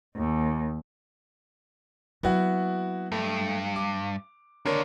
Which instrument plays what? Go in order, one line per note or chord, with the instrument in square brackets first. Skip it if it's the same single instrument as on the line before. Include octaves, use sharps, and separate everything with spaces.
[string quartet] D#2
[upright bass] F#3 A#3 [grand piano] B3 E4 F#4
[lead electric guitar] G2 [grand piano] A3
[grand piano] D6
[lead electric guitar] D#2 D3 [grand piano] D4 A#4 C#5